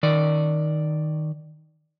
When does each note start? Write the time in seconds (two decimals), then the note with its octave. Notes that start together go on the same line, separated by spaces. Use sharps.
0.03 D#3 D5